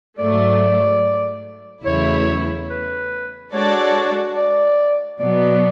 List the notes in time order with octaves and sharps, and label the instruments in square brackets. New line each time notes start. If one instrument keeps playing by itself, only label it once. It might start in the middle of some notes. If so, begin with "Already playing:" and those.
[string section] G#2 F#3 A3 [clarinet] D5
[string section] E2 C#3 F#3 A3 E4 [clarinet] C#5
[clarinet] B4
[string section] G#3 D4 F#4 A4 D5 [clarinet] C#5
[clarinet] D5
[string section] B2 F#3 B3 [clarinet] D5